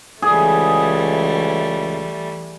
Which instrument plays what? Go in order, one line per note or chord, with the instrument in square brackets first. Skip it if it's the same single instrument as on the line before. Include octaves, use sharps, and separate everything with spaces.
[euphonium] C#2 [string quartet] E3 G3 A3 [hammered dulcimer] G#4